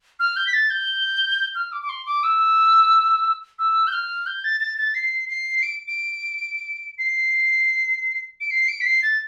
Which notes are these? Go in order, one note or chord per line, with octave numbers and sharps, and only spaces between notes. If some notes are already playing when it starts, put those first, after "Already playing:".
F6
G6
B6
A6
G6
F6
D6
D6
C6
D6
E6
E6
G6
F6
G6
A6
A6
A6
C7
C7
D7
D7
C7
D7
C7
D7
B6
C7
A6